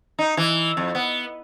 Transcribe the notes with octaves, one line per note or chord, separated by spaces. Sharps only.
D#4
E3
F2
B3